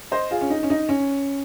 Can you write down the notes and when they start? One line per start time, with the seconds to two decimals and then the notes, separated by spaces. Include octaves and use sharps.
0.11 C5 D#5
0.31 F4 G#4
0.41 C#4
0.50 D#4
0.63 C#4
0.70 D#4
0.89 C#4